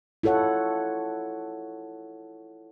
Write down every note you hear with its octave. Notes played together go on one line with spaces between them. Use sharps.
E4 F4 A4 C#5 F#5